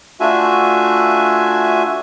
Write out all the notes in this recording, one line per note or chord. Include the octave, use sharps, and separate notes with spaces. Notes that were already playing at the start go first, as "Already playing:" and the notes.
A3 D4 F4 F#4 E5 G#5